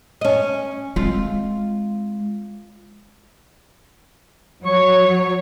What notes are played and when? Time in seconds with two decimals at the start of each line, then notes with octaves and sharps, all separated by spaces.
0.21 C#4 D#5
0.96 G#3 C4 F4
4.65 F#3 C#5 C#6